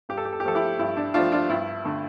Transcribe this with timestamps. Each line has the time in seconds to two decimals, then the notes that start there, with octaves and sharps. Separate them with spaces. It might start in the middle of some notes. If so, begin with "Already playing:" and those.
0.09 G2 G4
0.18 A4
0.25 G4
0.33 A4
0.40 G4
0.45 F3 A3 A4
0.55 E4 G4
0.79 G2 E4
0.97 D4
1.14 F3 A3 D4 F4
1.32 D4 F4
1.49 G2 E4
1.85 D3 A3